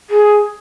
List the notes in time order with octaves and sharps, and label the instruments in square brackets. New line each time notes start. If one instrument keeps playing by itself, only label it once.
[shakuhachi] G#4